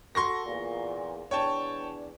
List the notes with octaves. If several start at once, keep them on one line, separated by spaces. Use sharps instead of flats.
F#4 A4 C6 C#6 A#6
E2 A#2
E2 D4 C#5 G5 A5